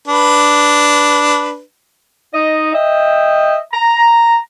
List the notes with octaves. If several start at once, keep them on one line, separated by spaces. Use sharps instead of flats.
D4 B4
D#4 D#5
D#5 E5 G5
A#5